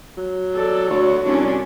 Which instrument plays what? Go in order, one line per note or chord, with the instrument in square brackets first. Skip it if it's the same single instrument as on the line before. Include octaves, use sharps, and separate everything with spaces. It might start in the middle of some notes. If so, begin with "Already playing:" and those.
[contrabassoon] F#3
[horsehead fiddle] A4 D5
[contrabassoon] D2 [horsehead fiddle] F#4 C#5
[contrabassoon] C2 [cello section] C#4 D4